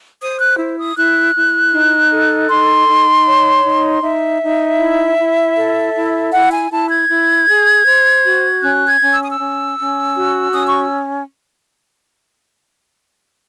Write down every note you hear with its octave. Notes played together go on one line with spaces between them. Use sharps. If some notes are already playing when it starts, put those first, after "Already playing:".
C5 D#6
F#6
E4
D#6
E4 F#6
E4
D#4
A4
D#4 C6
D#4
C#5
D#4
D#4 E5
D#4
E4
E4
A4
E4
E4 F#5
G#5
E4 A5
G#6
E4
G#4
C5
F#4
C#4 F#6
G#6
C#4
E6
D#6
E6
C#4
C#4
F#4
C#4 D#6
C#6